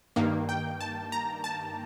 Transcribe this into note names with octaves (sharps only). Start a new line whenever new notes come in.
G2 D#3 A#3
G5
A5
A#5
A5